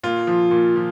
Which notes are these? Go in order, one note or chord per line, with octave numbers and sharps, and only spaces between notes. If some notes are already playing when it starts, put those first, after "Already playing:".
A#2 F4
F3
A#2
F3